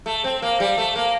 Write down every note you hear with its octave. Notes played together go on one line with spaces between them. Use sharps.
A3
C4
A#3
G3
A3
A#3